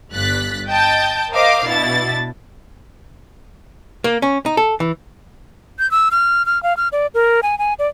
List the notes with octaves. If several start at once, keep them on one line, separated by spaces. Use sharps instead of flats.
G1 G2 F#6 A6 B6
D#5 G5 A5 G6 A6
A#4 C5 D#5 F5 D6
B2 D4 E4 A6
A#3
C#4
D#4
A4
E3
G6
E6
F6
F6
F5
F6
D5
A#4
G#5
G#5
D5